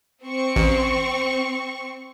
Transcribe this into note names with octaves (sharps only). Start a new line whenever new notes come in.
C4 C#6
A1